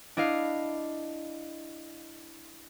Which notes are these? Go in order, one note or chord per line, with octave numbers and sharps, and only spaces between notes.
D4 E4 D#5 F5